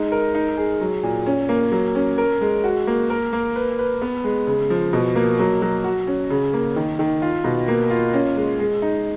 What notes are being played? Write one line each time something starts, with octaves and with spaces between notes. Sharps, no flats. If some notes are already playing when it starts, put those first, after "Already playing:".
Already playing: G#3 D#4
A#4
D#4
G#4
F#3
A#2
C#4
A#3
F#3
C#4
A#4
G#3
F#4
A#3
A#4
A#3
B4
B4
B3
G#3
C#3
F3
B2
A#3
F#3
F#3
F#4
C#4
C#3
A#3
D#3
D#3
F4
B2
A#3
F4
C#4
G#3
G#3
D#4